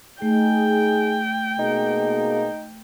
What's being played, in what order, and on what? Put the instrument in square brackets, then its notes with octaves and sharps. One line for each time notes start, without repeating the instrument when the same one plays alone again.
[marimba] A3 [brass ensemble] D#4 G#4 [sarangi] G5
[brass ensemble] B2 A#3 G#4 [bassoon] D#4